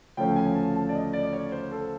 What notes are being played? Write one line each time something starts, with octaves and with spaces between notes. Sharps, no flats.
D2 C#3 F3 A3 C#4 G5
G#5
A5
A5
D5
D#5
D5
C#5
C5
A4